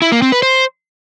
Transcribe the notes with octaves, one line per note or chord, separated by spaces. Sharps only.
E4
A#3
C4
B4
C5